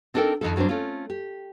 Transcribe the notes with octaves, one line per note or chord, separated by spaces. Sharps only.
C4 D4 D#4 A4 A#4 G5
F2 G#2 D#3 F3 A4
G2 F#3 C4 D4 C5
A3 C4 C#4 F4
G4